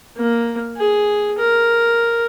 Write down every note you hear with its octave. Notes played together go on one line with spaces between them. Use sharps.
A#3
G#4
A#4